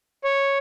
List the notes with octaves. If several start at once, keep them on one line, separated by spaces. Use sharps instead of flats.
C#5